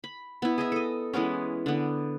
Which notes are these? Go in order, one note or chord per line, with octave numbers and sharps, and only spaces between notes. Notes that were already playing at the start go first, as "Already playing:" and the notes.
B5
B3 E4
G#4 D#5 E5
A4 D#5
E3 G#3 B3 C#4
D3 B3